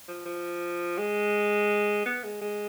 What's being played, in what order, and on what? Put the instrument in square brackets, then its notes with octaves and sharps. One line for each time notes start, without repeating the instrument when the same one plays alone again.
[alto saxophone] F3
F3
G#3
B3
G#3
G#3